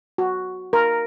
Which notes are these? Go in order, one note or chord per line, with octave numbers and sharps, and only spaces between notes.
F#4
A#4